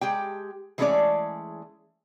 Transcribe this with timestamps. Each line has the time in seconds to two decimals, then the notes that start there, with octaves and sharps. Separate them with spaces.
0.01 G#3 G4 G5
0.78 E3 G#3 A3 C#4 G#4 D5